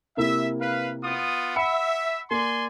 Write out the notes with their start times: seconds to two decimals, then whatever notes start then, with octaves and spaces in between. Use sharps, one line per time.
0.17 C3 A#3 E4 E5
0.60 B4 F5
1.04 B3 F4 D#6
1.56 E5 F#5 B5 C#7
2.31 A#3 D5 G#5 C6